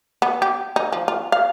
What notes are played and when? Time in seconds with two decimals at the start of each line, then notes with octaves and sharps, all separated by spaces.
0.22 B3
0.42 G4
0.76 D#4
0.92 F3
1.08 F4
1.32 F5